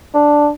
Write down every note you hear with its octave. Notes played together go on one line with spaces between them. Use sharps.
D4